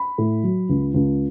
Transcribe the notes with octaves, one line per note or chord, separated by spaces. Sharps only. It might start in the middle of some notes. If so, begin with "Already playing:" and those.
Already playing: B5
A2
F#3
C#2
C#2